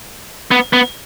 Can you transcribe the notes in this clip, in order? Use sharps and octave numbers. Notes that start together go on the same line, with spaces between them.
B3
B3